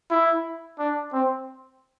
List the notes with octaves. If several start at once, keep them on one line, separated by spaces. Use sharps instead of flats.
E4
D4
C4